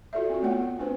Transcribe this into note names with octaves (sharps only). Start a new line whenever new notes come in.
F4 F#4 A4 D5 E5
C4 F4 F#4
A3 B3 C#5 F#5 G5
B3
C4 D4 B4 C5